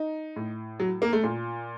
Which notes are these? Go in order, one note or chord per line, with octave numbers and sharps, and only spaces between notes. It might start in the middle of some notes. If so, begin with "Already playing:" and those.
Already playing: D#4
A2
F#3
A#3
A3
A#2